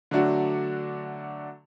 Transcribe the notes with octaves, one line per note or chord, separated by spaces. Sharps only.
D3 F#3 A3 D4 F#4